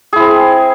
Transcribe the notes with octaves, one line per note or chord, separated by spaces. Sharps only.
C4 E4 G#4